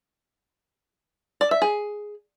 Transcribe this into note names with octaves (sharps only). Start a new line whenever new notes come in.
D5
E5
G#4